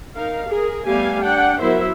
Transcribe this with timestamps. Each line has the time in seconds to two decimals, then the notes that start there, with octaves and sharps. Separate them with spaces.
0.15 D#4 A#4 F5
0.48 G#4 A#4
0.87 G3 A3 B3 G4 F5 G#5
1.22 D4 F#5 G5
1.61 F#3 B3 E4 A#4 C5 E5